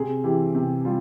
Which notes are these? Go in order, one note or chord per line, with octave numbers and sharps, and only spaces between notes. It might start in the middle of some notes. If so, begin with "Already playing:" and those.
Already playing: C3 G#4
E3 G4
C3 G4
G3 F4